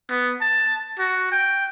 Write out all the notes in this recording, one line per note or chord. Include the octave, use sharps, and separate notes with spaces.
B3
A5
F#4
G5